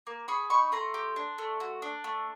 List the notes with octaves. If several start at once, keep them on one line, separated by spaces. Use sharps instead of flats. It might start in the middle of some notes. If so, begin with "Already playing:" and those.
A#3
G#4 B5 C#6
D#4 B5 C#6
A3 A#5 C6
G4
D4
A3
F#4
D4
A3